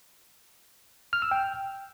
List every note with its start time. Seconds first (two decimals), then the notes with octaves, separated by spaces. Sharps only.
1.13 F6
1.22 E6
1.31 G5